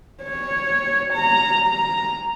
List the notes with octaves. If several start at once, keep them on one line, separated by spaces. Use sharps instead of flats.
C#5
A#5
A#5